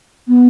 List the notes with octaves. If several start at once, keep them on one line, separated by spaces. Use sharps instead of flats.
B3